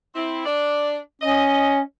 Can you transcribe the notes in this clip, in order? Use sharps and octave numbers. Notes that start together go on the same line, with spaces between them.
C4 E4
D4 D5
C#4 D#5